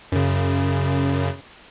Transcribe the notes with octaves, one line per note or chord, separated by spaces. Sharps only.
F#2 C#3